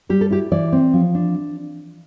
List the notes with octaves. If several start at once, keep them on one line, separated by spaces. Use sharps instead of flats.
G3 G4
A4
E4 G4
E3 D5
C4
F3
D4